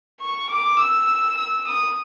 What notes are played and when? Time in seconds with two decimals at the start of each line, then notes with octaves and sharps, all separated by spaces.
0.21 C#6
0.49 D6
0.79 E6
1.37 E6
1.67 D#6